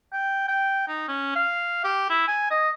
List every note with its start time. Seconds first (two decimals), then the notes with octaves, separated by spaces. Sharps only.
0.12 G5
0.48 G5
0.88 D#4
1.08 C#4
1.35 F5
1.84 G4
2.10 E4
2.28 G#5
2.50 D#5